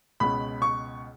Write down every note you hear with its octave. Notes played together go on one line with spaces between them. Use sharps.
C#2 B2 G#3 C#4 B5
C#6